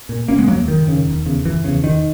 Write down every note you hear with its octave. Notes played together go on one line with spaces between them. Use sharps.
A#2
F#1 A#3 C#4
G#3 B3
B2 F#3 A#3
E2
F#1 D#3
F#2 C#3
E1
E2 C#3
F#1 E3
E2 C#3
E1 D#3